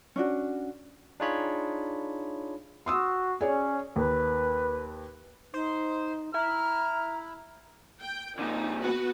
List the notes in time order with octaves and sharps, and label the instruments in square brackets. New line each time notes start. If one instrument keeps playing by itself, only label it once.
[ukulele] C#4 D4 F#4
[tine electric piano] D4 D#4 F4 G#4 C#5 B5
[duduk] F#4 [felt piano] C6 D#6 E6
[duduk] C#4 [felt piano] G#4 C#5 D5
[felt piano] D#2 [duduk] B4
[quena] D#4 [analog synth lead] C5
[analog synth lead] E4 [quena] A#5 [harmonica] F6
[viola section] G5
[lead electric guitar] A#2 D3 [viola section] D#4
[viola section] B3 F#4 B4